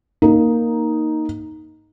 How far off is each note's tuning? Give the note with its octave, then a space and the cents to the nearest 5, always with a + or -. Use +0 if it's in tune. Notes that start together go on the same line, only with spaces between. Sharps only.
A#3 +0 D#4 +0